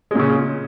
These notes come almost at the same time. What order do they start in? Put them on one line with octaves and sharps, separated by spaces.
G#3 A#2 C#3